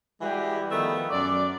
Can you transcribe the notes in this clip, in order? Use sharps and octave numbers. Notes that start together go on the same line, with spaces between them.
E3 G3 G#3 F#4 G4
D#3 F3 A3 B3
F#2 D5